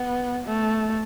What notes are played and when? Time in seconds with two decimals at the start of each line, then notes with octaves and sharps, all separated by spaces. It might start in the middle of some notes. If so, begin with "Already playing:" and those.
Already playing: B3
0.46 A3